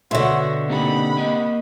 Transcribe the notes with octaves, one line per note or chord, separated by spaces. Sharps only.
B2 D3 F#4 C#5 E5 C6
C3 A#3 D#4 A4 F#5 B5
A#3 D#5